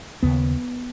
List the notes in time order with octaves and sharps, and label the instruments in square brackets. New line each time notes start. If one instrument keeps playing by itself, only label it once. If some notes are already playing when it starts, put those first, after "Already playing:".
[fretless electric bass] D#2 C#3 B3